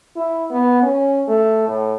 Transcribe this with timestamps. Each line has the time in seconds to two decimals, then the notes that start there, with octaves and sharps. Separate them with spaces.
0.17 E4
0.51 B3
0.82 C#4
1.28 A3
1.68 A2